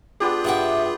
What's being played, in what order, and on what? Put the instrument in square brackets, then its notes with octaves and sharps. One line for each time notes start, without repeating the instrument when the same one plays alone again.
[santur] B3 D4 G4 [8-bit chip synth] F4 G#4
[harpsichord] G2 F#5 C#6 [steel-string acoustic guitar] E5 G5